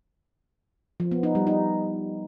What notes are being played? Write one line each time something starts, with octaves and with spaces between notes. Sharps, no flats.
F3
B3
D#4
G3
D#4